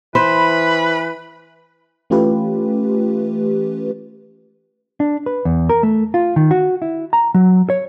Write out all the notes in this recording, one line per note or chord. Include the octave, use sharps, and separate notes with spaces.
E3 B4 C5 B5
E3 A3 C#4 F4 G4 B4
D4
B4
E2
A#4
A3
F4
D#3
F#4
E4
A#5
F#3
C#5